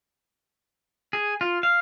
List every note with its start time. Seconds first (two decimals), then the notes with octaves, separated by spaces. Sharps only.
1.13 G#4
1.41 F4
1.63 F5